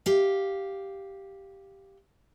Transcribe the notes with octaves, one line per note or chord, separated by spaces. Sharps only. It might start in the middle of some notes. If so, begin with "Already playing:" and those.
G4 F5